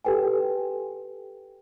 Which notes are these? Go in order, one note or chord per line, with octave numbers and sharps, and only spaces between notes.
G4 A4 B4 G5 G#5